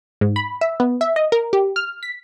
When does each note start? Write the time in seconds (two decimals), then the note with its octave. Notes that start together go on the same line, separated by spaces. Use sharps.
0.21 G#2
0.36 B5
0.61 E5
0.80 B3
1.01 E5
1.16 D#5
1.32 A#4
1.53 G4
1.76 F6
2.03 B6